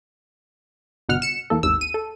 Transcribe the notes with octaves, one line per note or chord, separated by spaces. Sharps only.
G1 B2 F#5 F6
C#7 E7
E2 A#3 A4
G#1 D#2 E6
D#7
A4